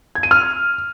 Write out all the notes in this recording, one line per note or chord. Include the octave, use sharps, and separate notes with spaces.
G#6
D#7
F6